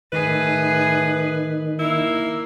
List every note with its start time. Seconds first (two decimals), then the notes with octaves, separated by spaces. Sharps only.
0.13 A2 D#3 G#4 B4
1.79 A#3 E4